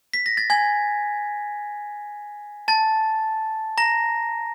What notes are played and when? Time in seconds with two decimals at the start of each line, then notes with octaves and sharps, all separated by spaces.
0.14 B6
0.26 A#6
0.37 A6
0.50 G#5 G#6
2.68 A5 A6
3.78 A#5 A#6